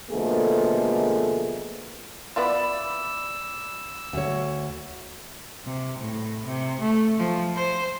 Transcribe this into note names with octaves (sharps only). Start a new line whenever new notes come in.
B2 D3 F3 A3 A#3 G#4
B3 E4 F4 D5 B5 D6 E6
D2 C#5
C3
A2
C3
A3
F3
C5